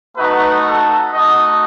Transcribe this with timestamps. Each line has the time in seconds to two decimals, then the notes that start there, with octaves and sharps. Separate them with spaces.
0.17 A3 D#4 F#4 B4
0.65 A4
1.12 A3 D#4 F#4 D#5